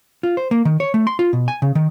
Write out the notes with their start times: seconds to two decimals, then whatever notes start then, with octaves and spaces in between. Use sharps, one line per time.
0.23 F4
0.37 C5
0.51 A#3
0.65 D#3
0.80 C#5
0.94 A3
1.07 C6
1.19 F4
1.33 B2
1.48 G#5
1.62 C#3
1.75 D#3